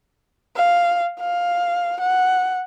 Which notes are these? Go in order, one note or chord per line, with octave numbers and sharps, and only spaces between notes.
F5
F5
F#5